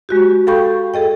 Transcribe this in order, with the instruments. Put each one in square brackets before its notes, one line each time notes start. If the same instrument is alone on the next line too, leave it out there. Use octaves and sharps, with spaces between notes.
[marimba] G#3 F#4 G4
A4 F5 G5 B5 C#6 G6
G#4 A4 D#5 G5